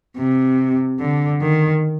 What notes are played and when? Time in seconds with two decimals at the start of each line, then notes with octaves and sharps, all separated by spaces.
0.18 C3
1.00 D3
1.41 D#3